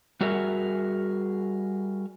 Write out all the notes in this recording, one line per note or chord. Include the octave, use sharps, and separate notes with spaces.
G3 F#4 G#4 A#4 E5